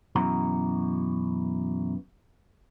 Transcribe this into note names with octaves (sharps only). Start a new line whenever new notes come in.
F#2 B2 E3 F#4 A#5